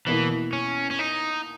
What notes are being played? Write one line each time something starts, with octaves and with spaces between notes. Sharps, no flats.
B2 E3 A#3 E4
C#4
C#4
D#4